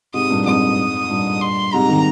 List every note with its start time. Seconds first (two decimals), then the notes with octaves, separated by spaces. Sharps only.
0.14 G#2 C3 D#6
0.30 G2 A#2
0.45 F2 G#2 D#6
1.10 G2 A#2
1.41 C6
1.73 G#2 C3 A#5
1.89 C3 D#3